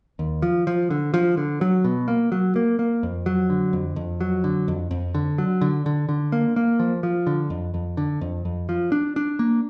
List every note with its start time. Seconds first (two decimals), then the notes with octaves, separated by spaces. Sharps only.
0.19 D#2
0.42 F3
0.67 F3
0.90 D3
1.14 F3
1.37 D3
1.61 F#3
1.85 B2
2.08 A#3
2.32 F#3
2.56 A#3
2.79 A#3
3.03 F2
3.26 F#3
3.50 D3
3.73 F2
3.96 F2
4.21 F#3
4.44 D3
4.68 F2
4.91 F2
5.14 D3
5.38 F#3
5.61 D3
5.86 D3
6.09 D3
6.32 A#3
6.56 A#3
6.79 F3
7.03 F3
7.27 D3
7.50 F2
7.74 F2
7.97 D3
8.21 F2
8.45 F2
8.69 F3
8.92 D4
9.16 D4
9.39 A#3